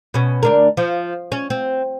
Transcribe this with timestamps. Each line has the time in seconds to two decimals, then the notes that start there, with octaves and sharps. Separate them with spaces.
0.14 B2 C#4
0.43 D2 D4 A#4
0.77 F3
1.32 C#4
1.50 C4